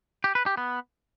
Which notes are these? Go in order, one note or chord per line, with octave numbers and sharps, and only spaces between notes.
G4
B4
G4
B3